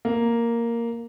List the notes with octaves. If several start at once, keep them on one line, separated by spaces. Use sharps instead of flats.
A#3